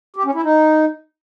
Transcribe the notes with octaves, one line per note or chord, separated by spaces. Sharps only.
G4
C#4
E4
D#4